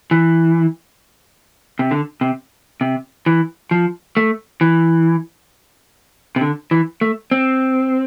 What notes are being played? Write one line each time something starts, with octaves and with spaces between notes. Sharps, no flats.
E3
C3
D3
C3
C3
E3
F3
A3
E3
C3
D3
E3
A3
C4